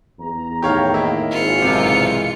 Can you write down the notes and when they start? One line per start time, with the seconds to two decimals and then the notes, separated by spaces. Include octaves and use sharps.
0.19 E2 A#5
0.62 A2 D#3 D#4 G4 C#5 F5
0.94 A#3 E4
1.31 G#1 F4 C#7
1.62 B1 G2 C3 E3 G#3